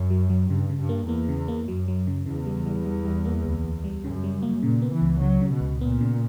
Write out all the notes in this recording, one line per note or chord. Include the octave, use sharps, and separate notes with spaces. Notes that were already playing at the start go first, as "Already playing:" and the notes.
Already playing: F#2
F#3
F#3
G2 C#3
C#3
G2
A#3
E2 A#3
C#3
A#3
F#2 F#3
F#3
C#3
E2 C#3
G3
G3
G3
G3
A#3
D2
D2
G3
F#2 C#3
G3
A#3
A#2 C#3
B3
E3
C#2
C#3 F#3
C#3
B2
C#2
A#2 B3
C#3